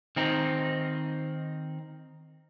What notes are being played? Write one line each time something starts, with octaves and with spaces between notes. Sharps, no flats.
D#3 C4 D#4